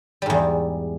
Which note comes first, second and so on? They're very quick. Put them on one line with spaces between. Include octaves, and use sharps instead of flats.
G3 G#2 E2